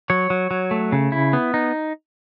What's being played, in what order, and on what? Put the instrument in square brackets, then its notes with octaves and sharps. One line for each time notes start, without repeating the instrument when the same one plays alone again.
[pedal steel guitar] F#3 C#5
F#3
F#3
A3
C#3
E4
B3
D#4